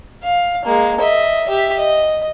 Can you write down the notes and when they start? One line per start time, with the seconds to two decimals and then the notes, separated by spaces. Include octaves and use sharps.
0.24 F5
0.65 G#3 A#3
1.00 D#5 E5
1.49 G4 E5
1.79 D#5